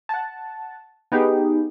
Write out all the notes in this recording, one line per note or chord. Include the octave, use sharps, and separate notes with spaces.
F#5 A5
B3 D#4 G4 G#4